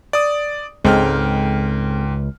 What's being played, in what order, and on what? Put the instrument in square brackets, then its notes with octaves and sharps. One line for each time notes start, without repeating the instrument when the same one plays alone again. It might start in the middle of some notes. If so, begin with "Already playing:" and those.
[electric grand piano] D5 D#6
[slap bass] C#2 [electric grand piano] G#2 G5 F6 [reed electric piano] G#3 C4 A4